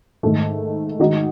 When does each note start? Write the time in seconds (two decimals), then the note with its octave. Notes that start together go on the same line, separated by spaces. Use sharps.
0.23 G#2 D#3 A3
0.99 D#3 G#3 D#4 F#4